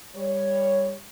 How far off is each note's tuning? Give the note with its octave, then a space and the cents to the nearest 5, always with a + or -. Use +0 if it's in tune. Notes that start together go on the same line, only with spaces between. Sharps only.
G3 +15 C#5 +0